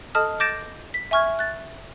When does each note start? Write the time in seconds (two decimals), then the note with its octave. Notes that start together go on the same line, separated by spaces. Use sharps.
0.15 A4 D#5 A5 D#6 F6
0.40 D6 G6 A6 A#6 D7 E7
0.94 B6
1.11 E5 G#5 C#6 F6 G#6
1.39 F#6 A6